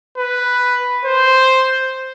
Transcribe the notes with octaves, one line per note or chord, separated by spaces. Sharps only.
B4
C5